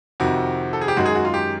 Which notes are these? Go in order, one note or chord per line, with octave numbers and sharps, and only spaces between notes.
F2 C3 D#3 F#4
A4
G#4
G4
F#2 D#3 G#3 F#4
G#4
F#4
F4
G4